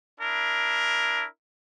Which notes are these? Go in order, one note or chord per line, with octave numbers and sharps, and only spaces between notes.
D4 E4 A#4